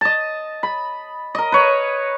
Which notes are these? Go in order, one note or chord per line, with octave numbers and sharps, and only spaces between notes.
D#5 A5
B5
A#4 D#5
B4 C#5